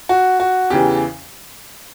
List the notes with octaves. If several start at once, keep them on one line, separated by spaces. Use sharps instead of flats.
F#4
F#4
E2 C#3 E3 G4